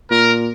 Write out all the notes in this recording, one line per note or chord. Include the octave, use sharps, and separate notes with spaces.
A#2 A#4